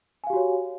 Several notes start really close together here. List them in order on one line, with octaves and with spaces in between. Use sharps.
G#5 F5 G4 F#4 C#5